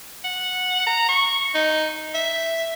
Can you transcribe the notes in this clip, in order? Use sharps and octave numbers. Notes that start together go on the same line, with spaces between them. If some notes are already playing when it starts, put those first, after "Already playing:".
F#5
A#5
C#6
D#4
E5